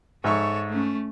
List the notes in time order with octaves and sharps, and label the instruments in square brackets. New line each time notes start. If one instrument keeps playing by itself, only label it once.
[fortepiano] G#2 E5 C#6 [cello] A4 C#5
[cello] A3 C#4